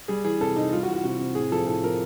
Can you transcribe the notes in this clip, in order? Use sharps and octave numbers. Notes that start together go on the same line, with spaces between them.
G3 G#4
E3 G#4
C3 A4
C3 D#4
G3 F4
F#4
E3
F#4
C3 F#4
C3
A2 G#4
F3 A4
A2 A4
F3 A#4